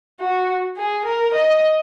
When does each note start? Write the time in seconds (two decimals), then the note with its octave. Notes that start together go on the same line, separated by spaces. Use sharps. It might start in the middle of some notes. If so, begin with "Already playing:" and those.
0.20 F#4
0.77 G#4
1.05 A#4
1.34 D#5